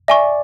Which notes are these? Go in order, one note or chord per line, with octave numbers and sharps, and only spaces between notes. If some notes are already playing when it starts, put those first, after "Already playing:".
D5 E5 G#5 C#6